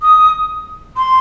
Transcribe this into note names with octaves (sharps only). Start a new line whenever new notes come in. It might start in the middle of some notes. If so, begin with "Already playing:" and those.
D#6
C6